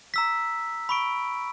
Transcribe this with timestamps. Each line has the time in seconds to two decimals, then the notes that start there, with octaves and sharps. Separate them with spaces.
0.14 A#5 E6 B6
0.89 B5 C#6 D7